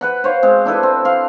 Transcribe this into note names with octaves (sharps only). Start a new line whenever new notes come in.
B4 F#5 B5
C5 C#5 F5
G#3 C4
D4 E4 A4 B4
C4
F5 C6